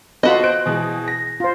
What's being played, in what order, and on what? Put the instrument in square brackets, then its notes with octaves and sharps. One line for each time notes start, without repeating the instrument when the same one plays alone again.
[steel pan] B3 F4 B5 [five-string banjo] F#4 D#5 [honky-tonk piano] A4
[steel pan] C5 [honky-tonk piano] F#6 D7
[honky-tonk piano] B2 E3 G#3
A#6
[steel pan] F4 C5